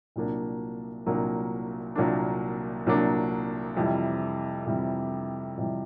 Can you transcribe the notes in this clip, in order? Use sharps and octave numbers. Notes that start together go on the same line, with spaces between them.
C2 A#2 F#3 A#3 D4
C2 A#2 F#3 A#3 D4
C2 A#2 F#3 A#3 D4
C2 A#2 F#3 A#3 D4
F2 C3 E3 G3
F2 C3 E3 G3
F2 C3 E3 G3